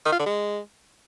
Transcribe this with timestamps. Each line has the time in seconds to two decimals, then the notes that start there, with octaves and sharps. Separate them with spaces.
0.06 D#3
0.12 F4
0.19 D3
0.26 G#3